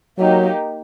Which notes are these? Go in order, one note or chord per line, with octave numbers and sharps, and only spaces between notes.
F#3 A#3 D#4 G4